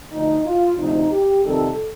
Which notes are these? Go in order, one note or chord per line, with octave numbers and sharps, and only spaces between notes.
D2 D3 F3 D#4
F4
D2 C3 F3 D#4
G4
F2 C3 D#3 G3 A4